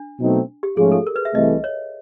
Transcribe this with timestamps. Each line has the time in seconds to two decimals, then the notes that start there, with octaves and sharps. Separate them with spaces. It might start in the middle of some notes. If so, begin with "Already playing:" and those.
Already playing: D4
0.19 B2 F#3 A3 C4 D#4
0.63 G4
0.77 G#2 F3 A3 C#4 F4 G#4
0.92 A4
1.07 A#4
1.16 B4
1.25 E5
1.34 C2 C3 E3 A3 D#5
1.64 C#5